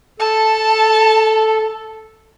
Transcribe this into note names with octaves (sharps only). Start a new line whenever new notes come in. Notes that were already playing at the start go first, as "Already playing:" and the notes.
A4 A5